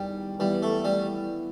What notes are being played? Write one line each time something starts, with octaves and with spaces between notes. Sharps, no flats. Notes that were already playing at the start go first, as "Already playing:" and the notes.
Already playing: E2 D#3 G3
E3 G3 B3 E4 B4
A3
G3